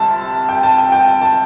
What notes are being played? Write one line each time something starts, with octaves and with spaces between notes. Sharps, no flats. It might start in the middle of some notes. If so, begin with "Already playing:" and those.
Already playing: C2 C3 A5
G5
A5
G5
G5
A5